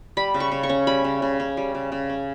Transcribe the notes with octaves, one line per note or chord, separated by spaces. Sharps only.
G3 B5
C#3
C#6
C#3
C#6
C#4
G3 B5
C#3
C#3
C#4
G3
C#3
C#3
C#4